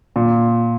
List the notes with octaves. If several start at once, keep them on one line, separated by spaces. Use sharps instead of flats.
A#2